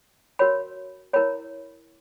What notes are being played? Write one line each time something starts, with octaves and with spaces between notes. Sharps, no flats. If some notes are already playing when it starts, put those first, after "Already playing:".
F#4 A#4 C#5 B5
E4 A#4 C#5 B5